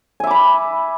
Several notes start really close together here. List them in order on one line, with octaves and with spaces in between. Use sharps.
G#5 E5 D6 B5